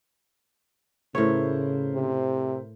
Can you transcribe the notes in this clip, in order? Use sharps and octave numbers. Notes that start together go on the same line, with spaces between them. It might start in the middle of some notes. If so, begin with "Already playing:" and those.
A2 C#3 E4 A#4 C5 C#5
C3